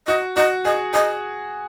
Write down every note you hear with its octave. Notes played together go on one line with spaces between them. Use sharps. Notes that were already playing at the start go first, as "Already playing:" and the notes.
F#4 D#5
F#4 D#5
G#4 D#5
G#4 D#5